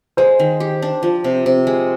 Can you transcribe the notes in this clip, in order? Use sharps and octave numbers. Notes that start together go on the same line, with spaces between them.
G#3 C5
D#3
G4
D4
F3
C3
C3
G#3